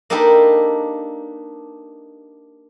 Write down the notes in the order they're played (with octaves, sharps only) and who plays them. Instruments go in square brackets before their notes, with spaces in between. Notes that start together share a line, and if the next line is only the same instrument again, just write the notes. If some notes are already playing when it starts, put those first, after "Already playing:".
[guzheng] A#3 D4 D#4 G4 A4 B4